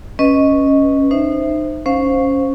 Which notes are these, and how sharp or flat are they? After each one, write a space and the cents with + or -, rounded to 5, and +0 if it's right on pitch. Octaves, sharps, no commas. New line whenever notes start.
C#4 +0 B4 +0 D#5 +0
D#4 -30 C5 +0 E5 +0
C#4 +0 C5 +0 F5 +15